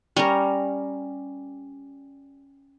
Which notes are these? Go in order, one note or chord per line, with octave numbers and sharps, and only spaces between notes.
G3 C#4 A#4